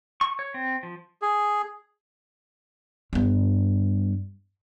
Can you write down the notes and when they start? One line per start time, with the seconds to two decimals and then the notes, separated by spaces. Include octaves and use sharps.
0.21 C#6
0.39 C#5
0.54 C4
0.83 F3
1.22 G#4
3.13 G2 B3